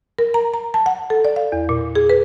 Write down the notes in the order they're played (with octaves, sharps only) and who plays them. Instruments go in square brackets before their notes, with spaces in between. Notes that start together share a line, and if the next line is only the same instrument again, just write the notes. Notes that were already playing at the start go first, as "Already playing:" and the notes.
[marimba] A#4
A#5
A#5
A5
F#5
A4
D5
F5
E2
A#2
G#4
B4